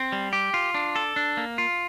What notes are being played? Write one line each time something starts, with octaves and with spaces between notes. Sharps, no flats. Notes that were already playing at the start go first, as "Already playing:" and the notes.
Already playing: C4
G3
G4
F4
D4
A4
D4
A#3
F4